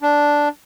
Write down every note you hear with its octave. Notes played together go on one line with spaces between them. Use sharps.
D4